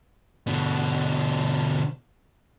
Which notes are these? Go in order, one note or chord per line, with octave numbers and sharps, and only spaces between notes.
B2 D3